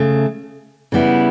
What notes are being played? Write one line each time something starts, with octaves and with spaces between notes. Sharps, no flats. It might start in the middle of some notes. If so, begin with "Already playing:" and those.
Already playing: C#3 A3
C#3 G3 B3 E4